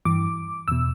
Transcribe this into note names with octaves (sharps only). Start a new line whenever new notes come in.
G2 E3 D6
E2 B2 E6